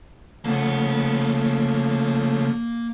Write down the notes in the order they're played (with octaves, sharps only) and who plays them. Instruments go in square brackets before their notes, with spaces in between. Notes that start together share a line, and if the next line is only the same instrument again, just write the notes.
[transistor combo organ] C#3 F3 A3 [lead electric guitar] A#3 F#5